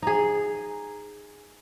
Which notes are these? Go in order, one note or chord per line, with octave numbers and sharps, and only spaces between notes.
D#4 G#4